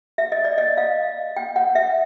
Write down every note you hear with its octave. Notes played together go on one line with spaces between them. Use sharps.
E5
D#5
D5
D#5
F5
G5
F#5
E5